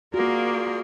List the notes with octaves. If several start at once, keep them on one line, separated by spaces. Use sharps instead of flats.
A#3 F4 F#4 G#4 D5